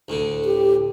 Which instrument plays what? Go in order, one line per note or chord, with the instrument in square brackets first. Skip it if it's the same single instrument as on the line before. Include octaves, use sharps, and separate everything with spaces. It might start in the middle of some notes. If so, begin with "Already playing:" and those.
[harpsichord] D2 A2 D3
[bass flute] G4